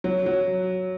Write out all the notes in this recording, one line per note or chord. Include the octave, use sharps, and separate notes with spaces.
F#3
F#3